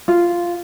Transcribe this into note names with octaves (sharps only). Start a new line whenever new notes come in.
F4